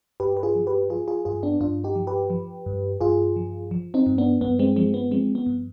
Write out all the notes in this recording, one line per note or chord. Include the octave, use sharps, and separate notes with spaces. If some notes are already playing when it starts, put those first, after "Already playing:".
G2 G4 B4
B4
F4 G#4
F3
G4 B4
F3 F4 G#4
F4 G#4
G2 F4 G#4
B3 D4
G2 D4 F4
D#4 G4
F3
G4 B4
F3
G2
G2 F4 G#4
F3
F3
C4 D#4
G2
B3 D4
G2 B3
G#3 C4
F3 G#3 C4
B3
F3 G#3 C4
B3
G2